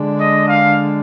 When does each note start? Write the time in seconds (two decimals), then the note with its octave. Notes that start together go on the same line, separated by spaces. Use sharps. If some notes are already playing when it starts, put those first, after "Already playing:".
Already playing: D3 G#3 D4
0.19 D#5
0.47 F5